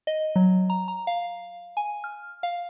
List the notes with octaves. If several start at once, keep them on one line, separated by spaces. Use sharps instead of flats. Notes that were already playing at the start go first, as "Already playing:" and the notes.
D#5
F#3
A#5
A#5
F5
G#5
F6
F5